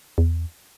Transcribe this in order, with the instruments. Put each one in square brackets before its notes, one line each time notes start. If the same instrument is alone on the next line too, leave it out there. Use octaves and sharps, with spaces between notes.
[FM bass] E2